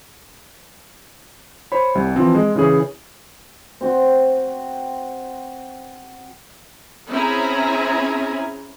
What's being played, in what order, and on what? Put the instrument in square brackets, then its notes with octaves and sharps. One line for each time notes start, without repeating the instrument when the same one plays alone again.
[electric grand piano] C5 C#5 B5
C2 G3
E3 F3 C4
G#3
C#3 E3 E4 G#4 C#5
[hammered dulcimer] C4 F#4
[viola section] C4 C#4 E4 G#4 G#5 A#5